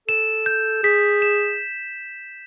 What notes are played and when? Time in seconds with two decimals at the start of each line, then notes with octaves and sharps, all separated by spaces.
0.08 A4 E7
0.46 G6
0.83 G#4 B6
1.22 E7